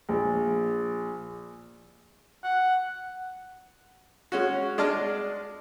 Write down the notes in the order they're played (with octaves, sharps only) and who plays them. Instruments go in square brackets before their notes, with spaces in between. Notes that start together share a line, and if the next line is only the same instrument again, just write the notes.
[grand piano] A#1
[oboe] F#5
[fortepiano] G#3 C#4 F#4
G#3 D4 D5 D#5 A5 F6